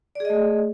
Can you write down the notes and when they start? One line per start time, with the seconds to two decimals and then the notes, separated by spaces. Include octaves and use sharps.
0.15 D5
0.20 G#4
0.25 D#5
0.30 A3